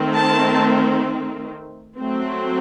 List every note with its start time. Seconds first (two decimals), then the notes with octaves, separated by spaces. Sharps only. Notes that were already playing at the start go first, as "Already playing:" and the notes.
Already playing: D#3 A3 C4
0.13 A5
1.99 F#3 A3 C4